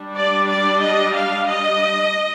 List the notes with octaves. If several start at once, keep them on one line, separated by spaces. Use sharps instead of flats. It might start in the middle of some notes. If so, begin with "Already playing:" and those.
Already playing: G3 D4
D5
D5
D#5
F5
D#5